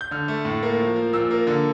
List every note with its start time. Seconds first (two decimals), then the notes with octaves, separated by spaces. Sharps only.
0.01 G6
0.11 D3 F6
0.28 A3
0.45 A2
0.63 A#3
0.80 F3
0.96 F3
1.13 A#2 E6
1.31 A#3
1.47 D3